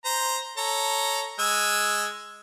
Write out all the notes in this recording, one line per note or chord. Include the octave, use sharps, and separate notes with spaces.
C5 A#5
A4 C#5 A#5
G#3 G#5 E6